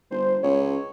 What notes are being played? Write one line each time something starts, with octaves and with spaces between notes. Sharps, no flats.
G1 C5
C#2 C#5